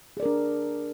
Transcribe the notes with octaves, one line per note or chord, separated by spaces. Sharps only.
D4 G#4 A#4 D5